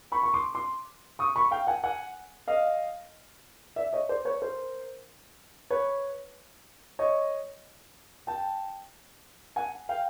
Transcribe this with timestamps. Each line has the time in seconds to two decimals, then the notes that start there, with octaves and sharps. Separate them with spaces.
0.12 B5 C#6
0.23 C#6
0.34 C6 D6
0.55 C6 D6
1.19 C#6 D#6
1.36 B5 C#6
1.51 F5 G5
1.67 F#5 G#5
1.83 F#5 G#5
2.48 D#5 F5
3.76 D5 E5
3.93 C#5 D#5
4.09 C5 D5
4.25 B4 C#5
4.42 A#4 C5
5.70 B4 C#5
6.99 C#5 D#5
8.27 G5 A5
9.56 F#5 G#5
9.89 F5 G5